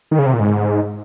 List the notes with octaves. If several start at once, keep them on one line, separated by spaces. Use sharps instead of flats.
D#3
C#3
C3
A#2
G#2